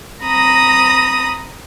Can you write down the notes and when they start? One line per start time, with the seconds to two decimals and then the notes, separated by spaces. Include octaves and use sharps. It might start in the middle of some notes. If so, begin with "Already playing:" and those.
0.23 C4 A#5 B5 D#6 A#6